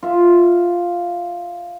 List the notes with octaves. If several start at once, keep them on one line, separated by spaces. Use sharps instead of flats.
F4 E5